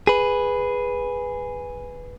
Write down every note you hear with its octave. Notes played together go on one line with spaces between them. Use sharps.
G#4 B4